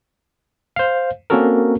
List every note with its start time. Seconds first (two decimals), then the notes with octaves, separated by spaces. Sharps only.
0.76 C5 F5
1.30 A#3 C4 C#4 F#4 A4 A#4